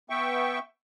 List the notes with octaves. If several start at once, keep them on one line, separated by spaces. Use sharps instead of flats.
B3 E5 G5 C#6